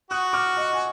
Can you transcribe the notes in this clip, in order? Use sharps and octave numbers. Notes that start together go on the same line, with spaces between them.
F#4 D#6 F#6
D6 F6
D#5 F#5
G#5